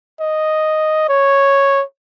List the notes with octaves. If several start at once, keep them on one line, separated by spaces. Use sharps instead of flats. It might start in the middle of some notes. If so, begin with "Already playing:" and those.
D#5
C#5